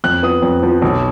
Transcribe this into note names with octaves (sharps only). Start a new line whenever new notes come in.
F2 F#6
F3 B3 D#6
F2
F3 B3
B1